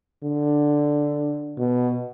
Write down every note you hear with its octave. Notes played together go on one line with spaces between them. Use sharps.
D3
B2